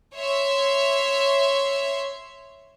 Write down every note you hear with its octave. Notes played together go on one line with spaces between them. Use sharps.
C#5 E5 C6